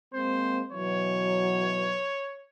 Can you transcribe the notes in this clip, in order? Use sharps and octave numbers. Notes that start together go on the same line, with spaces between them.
G#3 A#3 C4 C5
B2 E3 F#3 C#5